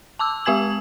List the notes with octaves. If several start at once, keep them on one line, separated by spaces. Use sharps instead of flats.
A5 D6 E6
G#3 G4 G#5 G#6 F#7